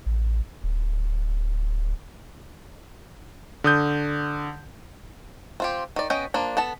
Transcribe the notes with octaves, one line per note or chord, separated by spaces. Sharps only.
A1
D1
D3 D#6 G6
C4 F4 G4
D#3 D5
B3 C#4 D#5 G5
F3 A#3 D4
B3 A4 A5